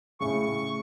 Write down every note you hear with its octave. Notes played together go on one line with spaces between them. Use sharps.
A2 C#3 C#6